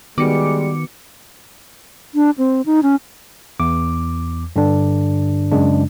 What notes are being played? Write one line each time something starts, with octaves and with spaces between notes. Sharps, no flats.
D#3 G3 G#3 B3 F#4 D6 C#7
D4
C4
D#4
C#4
E2 D6
G2 D3 D4
F#2 C#3 G#3 D4